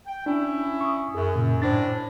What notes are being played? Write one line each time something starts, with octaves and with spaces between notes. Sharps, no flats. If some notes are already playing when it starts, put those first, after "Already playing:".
G5
C#4 D4 E4
C#6 D#6
F#2 G#4
A#2 C#3
A2 D4 C5 A6